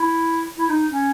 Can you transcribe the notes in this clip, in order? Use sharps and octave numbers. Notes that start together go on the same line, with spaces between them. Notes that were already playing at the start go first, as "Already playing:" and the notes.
Already playing: E4
E4
D#4
C#4